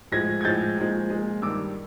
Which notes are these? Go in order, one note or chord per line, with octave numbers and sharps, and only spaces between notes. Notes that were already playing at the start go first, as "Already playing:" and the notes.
A2 F3 G#3 G#6 A#6
G#6
A2 F3 G#3 G6 A6
A#2 F3 G#3
A#2 F3 G#3
G2 D#3 G3 D6 E6